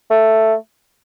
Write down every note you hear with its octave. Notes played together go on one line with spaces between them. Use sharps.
A3